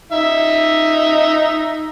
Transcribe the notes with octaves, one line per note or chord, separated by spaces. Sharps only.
D#4 E5